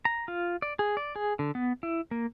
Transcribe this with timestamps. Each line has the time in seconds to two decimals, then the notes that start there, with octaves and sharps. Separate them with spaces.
0.05 A#5
0.28 F4
0.62 D5
0.79 G#4
0.97 D5
1.16 G#4
1.39 D3
1.55 B3
1.83 E4
2.11 A#3